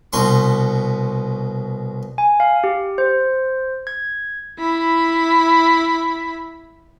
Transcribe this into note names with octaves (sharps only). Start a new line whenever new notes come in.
C2 B2 C6 C#6
G#5
F5
G4
C5
G#6
E4 B5